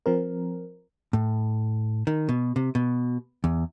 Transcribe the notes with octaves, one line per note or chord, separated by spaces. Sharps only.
F3 C4 A#4
A2
D#3
B2
C3
B2
E2